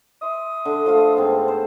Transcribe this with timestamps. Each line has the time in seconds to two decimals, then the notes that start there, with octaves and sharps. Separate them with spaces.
0.22 E5 C6 D#6
0.65 D3
0.86 F3 A3 F4
1.17 G#2 B3 C4
1.48 C5